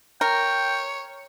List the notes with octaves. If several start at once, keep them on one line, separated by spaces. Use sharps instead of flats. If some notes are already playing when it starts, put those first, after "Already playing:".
A#4 C#5 G5